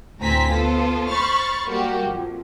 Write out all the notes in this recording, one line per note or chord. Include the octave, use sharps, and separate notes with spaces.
D2 A2 C4 G#5 A#5 B6
B3 F4 A4 C5
C5 B5 C#6 F6 A6
G3 A#3 F#4 G4
F2